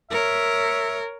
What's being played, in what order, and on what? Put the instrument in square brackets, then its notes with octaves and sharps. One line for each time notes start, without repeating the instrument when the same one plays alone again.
[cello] A#4 C#5 [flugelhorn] E5